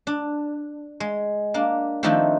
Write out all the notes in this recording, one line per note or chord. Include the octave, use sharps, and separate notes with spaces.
D4
G#3
A#3 D4
D#3 F3 A3 C4 D4 D#4